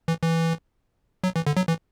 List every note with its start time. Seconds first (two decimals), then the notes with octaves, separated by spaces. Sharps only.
0.08 E3
0.23 E3
1.24 F#3
1.36 E3
1.47 D3
1.57 F#3
1.68 E3